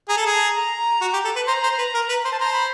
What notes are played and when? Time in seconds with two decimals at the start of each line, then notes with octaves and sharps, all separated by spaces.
0.09 G#4 A#5
0.17 A4
0.21 A5
0.26 G#4
0.32 A#5
0.55 A#5
1.01 F#4
1.13 G4
1.25 A4
1.36 B4
1.47 C5 A#5
1.63 C5
1.78 B4
1.94 A#4
2.09 B4
2.25 C5
2.32 A5
2.40 C5 A#5
2.53 B5